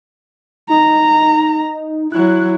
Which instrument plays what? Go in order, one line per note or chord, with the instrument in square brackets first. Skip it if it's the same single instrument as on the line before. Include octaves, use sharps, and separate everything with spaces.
[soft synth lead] D#4 [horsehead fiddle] A#5
[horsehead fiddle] F#3 E4 [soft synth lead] F#6